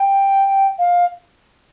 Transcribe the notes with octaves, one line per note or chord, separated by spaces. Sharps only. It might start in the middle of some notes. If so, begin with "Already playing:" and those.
Already playing: G5
F5